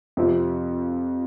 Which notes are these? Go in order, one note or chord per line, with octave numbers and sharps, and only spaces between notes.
F2 C3 F3 C4 F4